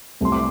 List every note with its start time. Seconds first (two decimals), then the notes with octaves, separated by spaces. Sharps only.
0.21 C2 C3 A3 C6
0.32 D6